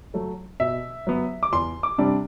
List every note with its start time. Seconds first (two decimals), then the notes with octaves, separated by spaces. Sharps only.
0.14 F#3 A3
0.60 B2 E5
1.07 F#3 B3
1.43 D6
1.53 E2 C6
1.83 D6
1.98 C3 G3 D4